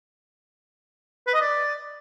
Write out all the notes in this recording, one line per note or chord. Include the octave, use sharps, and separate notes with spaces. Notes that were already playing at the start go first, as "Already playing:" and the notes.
B4
D#5
D5